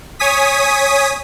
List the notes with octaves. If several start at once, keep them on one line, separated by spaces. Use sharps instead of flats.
C#5 G#5 D#6 B6